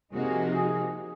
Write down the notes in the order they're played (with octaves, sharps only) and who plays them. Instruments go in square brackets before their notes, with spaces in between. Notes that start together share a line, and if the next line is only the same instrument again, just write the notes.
[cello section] C3 F3 A#3 D#4 F#4 [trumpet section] G#4
[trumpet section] G#4